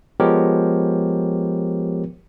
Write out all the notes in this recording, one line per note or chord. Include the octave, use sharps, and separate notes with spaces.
F3 G#3 B3 G4 A#4 C#5